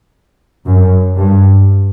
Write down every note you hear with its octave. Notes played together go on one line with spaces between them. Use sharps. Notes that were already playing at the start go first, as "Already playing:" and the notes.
F#2
G2